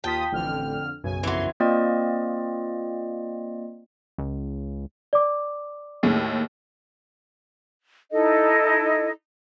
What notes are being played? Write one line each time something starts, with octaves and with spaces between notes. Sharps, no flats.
D#2 F4 G5 A5 D#6 B6
A1 F2 D3 F6
B1 F#2 C#3 G#5
F2 E3 F#3 C6
A#3 C4 F4 D5 D#5
C#2
D5 D6
D#2 A2 G#4
D#4 E4 A4 D#5